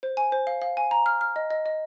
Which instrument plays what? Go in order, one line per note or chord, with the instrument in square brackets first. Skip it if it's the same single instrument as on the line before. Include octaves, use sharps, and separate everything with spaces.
[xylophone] C5
G#5
C5
F5
F5
G#5
A#5
F6
F6
D#5
D#5
D#5